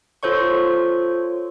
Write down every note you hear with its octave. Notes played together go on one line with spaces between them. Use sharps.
F4 A4 C5 C#5 C#6